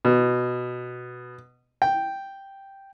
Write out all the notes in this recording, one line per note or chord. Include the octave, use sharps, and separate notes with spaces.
B2
G5